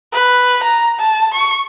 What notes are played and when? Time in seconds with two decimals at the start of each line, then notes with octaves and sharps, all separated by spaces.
0.13 B4
0.63 A#5
0.99 A5
1.34 C#6